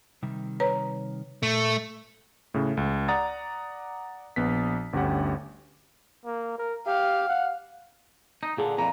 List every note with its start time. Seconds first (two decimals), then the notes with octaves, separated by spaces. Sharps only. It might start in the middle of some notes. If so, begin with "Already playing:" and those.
0.23 C3 D#3 G3
0.60 B4 C#5 A#5
1.43 A#2 A3
2.54 A2 C#3
2.77 C#2
3.08 D5 F#5 A#5 D#6 A6
4.36 A#1 B3 B6
4.93 G1 D2 C#4 G4 F#5
6.25 A#3
6.58 A#4
6.87 G4 F5
7.28 F#5
8.43 D#4
8.58 A#2 D3 G#4
8.78 F2 A#2 E3 A#5